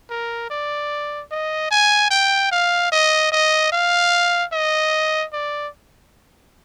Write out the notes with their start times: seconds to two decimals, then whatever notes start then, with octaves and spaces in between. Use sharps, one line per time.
0.10 A#4
0.50 D5
1.32 D#5
1.71 G#5
2.11 G5
2.52 F5
2.92 D#5
3.32 D#5
3.72 F5
4.53 D#5
5.33 D5